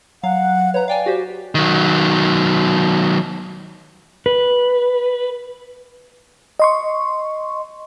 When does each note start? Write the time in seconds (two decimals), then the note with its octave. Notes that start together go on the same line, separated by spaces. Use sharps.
0.23 F#3 F5 F#5
0.74 B4 C#5 A#5
0.88 D5 F5 G5 G#5
1.06 F#4 G4 C5
1.55 D#3 F#3
4.26 B4
6.60 D#5 C6 C#6